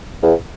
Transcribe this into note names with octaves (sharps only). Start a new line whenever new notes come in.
E2